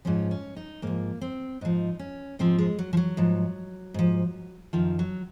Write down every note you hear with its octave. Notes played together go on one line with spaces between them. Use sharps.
G#2 F3 C#4
C#4
D#4
G#2 F3 A#3
C4
G#2 F3 D#4
C#4
G#2 F3 C4
G#3
F#3
F3
F#3
G#2 F3
G#2 F3
F#2 D#3 F3
F#3